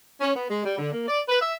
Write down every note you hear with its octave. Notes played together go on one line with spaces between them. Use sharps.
C#4
B3
G#3
G3
D3
A#3
D5
B4
E5